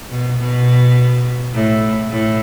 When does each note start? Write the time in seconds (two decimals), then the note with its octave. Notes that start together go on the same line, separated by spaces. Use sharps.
0.11 B2
0.39 B2
1.54 A2
2.11 A2